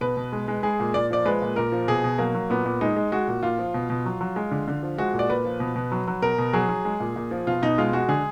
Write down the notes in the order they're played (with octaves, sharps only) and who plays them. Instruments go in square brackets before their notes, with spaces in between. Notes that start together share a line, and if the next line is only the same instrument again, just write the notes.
[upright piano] B2 B4
B2
G#3
G#3
G#3 G#4
A#2
A#2 D5
F3 D5
G#3 B4
A#2
A#2 A#4
F3
B2 G#4
B2
F#3 A#3
F#3
A#2 B3
A#2
G#3 D#4
G#3
G#3 F#4
A#2
A#2 F4
F3
B2
B2
F#3
F#3
G#3
D3
D3
F3
G#3 F#4
A#2
D5
A#2 B4
F3
B2
B2
F#3
F#3
B2 A#4
B2
F#3 G#4
F#3
G#3
A#2
A#2
F3
B2 F4
B2 D#4
G#3 F4
G#3 F#4
D3 G#4